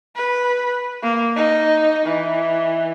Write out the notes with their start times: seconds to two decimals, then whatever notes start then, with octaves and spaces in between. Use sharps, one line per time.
0.16 B4
1.03 A#3
1.36 D#4
2.06 E3